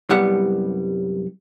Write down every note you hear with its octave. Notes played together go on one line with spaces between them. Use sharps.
C2 F#2 G3 B3 F#5